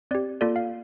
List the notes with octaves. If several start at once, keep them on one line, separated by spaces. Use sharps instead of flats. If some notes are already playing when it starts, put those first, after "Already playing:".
C4 G4 D5
A#3 F4 A4 D5
F5